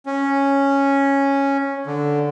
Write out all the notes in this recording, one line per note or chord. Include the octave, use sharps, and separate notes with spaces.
C#4
D3